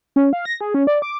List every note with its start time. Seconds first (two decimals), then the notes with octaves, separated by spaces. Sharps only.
0.16 C#4
0.33 F5
0.45 A#6
0.61 G#4
0.74 C#4
0.87 D5
1.02 D6